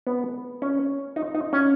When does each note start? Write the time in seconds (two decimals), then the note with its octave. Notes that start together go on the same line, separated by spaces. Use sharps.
0.07 B3
0.62 C#4
1.16 D#4
1.35 D#4
1.53 C#4